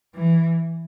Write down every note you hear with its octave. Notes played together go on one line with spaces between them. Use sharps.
E3